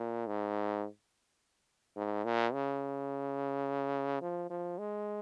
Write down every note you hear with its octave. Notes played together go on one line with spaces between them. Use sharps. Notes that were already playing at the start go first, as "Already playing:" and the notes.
Already playing: A#2
G#2
G#2
A#2
C#3
F3
F3
G#3